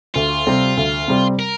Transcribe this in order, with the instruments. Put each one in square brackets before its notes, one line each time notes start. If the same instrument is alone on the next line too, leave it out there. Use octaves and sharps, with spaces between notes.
[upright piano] D2 [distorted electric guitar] F4
[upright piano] C3 G3 C4
D2
C3 G3 C4
[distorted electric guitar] A#4